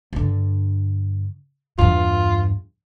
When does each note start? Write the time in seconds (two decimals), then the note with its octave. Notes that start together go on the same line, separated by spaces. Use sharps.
0.13 G2 D3
1.78 E2 G2 F4